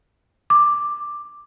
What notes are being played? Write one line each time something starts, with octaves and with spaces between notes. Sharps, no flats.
D6